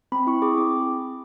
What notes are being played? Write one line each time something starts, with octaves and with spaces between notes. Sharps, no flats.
C4 B5
E4 C#6
G#4 D6
C4 D6